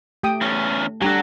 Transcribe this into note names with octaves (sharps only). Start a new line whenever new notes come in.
A3 G4 G5 D#6
E2 C#4
F#3 G3 D4 F#4 G4 A4